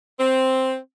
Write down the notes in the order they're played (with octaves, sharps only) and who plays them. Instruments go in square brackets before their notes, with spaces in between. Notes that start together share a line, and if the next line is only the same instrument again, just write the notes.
[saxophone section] C4